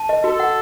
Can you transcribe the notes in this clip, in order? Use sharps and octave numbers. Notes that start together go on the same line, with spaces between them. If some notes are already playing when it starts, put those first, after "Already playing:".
Already playing: A5
D#5
F#4 A4
F#5